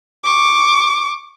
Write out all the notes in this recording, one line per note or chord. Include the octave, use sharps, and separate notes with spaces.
C#6 D6